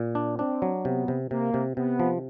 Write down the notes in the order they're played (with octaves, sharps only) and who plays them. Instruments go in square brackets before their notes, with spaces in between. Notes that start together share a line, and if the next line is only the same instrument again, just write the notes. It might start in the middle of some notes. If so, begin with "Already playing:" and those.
Already playing: [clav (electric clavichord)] A#2
D4
[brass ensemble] C4 [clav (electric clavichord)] D4
[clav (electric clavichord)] F#3
[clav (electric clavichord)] C3 [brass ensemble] B3
[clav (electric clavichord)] C3
[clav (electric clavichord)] C3 [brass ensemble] A#3
[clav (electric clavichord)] C3
[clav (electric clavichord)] C3 [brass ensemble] B3
[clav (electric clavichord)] F3